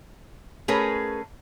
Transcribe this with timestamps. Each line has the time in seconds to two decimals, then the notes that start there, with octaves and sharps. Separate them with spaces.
0.68 A3 C#4 G#4 A#4 B4